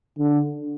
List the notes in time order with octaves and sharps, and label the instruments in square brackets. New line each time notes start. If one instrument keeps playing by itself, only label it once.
[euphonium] D3